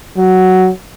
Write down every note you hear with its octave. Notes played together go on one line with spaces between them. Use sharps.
F#3